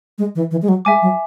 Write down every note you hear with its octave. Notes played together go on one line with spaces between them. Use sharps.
G#3
E3
E3
G#3
F#3
G#3 E5 G#5 D6
F#3